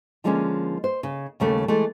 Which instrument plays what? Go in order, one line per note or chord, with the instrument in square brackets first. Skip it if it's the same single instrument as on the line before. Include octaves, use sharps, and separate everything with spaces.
[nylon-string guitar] D3 F3 G#3 A#3 C4 C#4
C5
C#3
D#2 C#3 A3
E3 G#3 A3